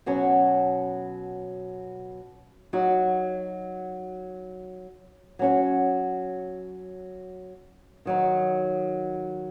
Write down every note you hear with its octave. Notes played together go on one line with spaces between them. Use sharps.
B2 F#3 C#4 F#4
F#3 D#4 F#4
F#3 C#4 F#4
D#3 F#3 D#4